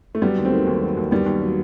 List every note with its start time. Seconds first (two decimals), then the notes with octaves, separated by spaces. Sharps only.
0.15 A3
0.22 F#3 G3 B3
0.38 D#2
0.45 A3 C4
0.53 D#3
0.67 D#2
0.82 F#3
0.97 D#2
1.11 D#3 G3 B3
1.26 D#2
1.41 F#3